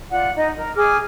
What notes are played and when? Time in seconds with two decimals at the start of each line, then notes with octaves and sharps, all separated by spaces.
0.10 F4 D5 F#5
0.36 D#4 D#5
0.56 A#4
0.75 G#4 D6 F6